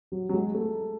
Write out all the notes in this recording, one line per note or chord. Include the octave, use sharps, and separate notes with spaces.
F#3
F#3
G#3
A3